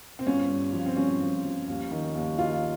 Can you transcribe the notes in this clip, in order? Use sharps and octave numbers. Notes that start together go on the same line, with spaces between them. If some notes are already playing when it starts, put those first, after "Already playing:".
C4
G1 C#4
G2
F3
C4
G1 C#4
F3
F3
D#2
D#3
D#2
D#3 F4